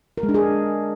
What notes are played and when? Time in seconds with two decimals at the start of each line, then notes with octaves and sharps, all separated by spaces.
0.18 A#4
0.23 G#3
0.29 D4
0.34 G#4